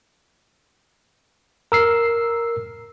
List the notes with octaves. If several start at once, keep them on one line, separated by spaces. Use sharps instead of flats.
A#4 E6 C7